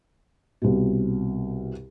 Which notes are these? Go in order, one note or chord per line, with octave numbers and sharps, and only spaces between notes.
C2 B2